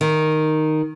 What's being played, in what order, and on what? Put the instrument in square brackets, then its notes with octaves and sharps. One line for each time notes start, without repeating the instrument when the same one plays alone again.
[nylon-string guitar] D#3